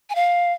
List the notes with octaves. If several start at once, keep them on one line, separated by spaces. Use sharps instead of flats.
G#5
F5